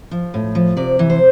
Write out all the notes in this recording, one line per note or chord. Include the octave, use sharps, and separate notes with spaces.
F3
A2
F3
C3 D5
E3
C5